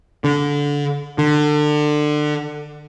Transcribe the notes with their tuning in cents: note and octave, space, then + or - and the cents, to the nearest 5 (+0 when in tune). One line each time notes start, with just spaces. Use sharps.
D3 -20
D3 +25